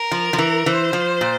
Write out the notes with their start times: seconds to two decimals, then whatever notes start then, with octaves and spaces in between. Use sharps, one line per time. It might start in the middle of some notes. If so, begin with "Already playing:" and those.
Already playing: A#4
0.11 F3
0.33 F3
0.38 E3
0.66 E3 C5
0.93 F3
1.21 A#2